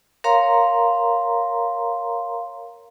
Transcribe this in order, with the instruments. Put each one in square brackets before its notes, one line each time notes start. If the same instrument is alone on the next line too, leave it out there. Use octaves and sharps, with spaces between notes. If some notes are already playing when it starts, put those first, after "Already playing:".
[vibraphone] A#4 C#5 F5 A#5 C6